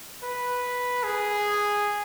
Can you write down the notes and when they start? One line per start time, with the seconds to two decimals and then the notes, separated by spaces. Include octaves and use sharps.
0.23 B4
1.03 G#4